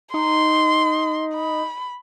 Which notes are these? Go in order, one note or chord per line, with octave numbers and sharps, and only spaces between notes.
D#4 C6
B5